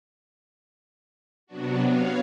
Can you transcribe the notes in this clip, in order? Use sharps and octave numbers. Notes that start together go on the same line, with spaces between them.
C3 F#3 B3 D4 F#4
B3 C#5 F5